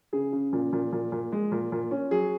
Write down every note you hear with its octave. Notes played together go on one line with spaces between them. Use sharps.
C#3 G#4
C#3
A#2
A#2
A#2
A#2
G#3
A#2
A#2
C#4
F#3 G#4